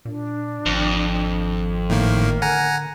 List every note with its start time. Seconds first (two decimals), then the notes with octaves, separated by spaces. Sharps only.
0.05 A#2 D4
0.66 G#1 F2
1.90 A2 D#3 A#3 A#4
2.42 D3 F#5 G#5 A#5